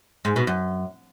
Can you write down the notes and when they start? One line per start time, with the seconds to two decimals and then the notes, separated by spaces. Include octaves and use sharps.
0.25 G#2
0.36 B2
0.47 F#2